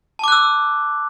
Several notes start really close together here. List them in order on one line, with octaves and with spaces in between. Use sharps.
A5 D6 F#6 E6